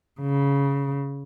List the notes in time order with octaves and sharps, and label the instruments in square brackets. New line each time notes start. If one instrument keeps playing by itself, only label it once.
[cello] C#3